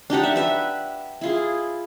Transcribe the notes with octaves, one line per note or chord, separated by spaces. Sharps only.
D4 D#4 G4 F#5
E5
B4 E5
E4 F4 G#4